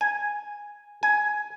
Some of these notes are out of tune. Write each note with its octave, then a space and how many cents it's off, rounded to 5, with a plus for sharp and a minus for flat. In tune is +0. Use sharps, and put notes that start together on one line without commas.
G#5 -5
G#5 +10